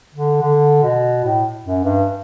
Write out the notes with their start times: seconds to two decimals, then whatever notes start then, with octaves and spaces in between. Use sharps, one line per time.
0.15 D3
0.42 D3
0.84 B2
1.24 A2
1.64 F#2
1.84 G2